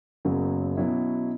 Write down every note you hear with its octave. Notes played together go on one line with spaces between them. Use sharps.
F#1 F#2 C#3 F#3 B3
B2 F#3 C#4 E4